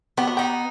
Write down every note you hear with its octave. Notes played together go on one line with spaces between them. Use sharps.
B3 G4
F#4
D#4 G4